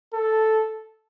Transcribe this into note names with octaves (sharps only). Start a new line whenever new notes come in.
A4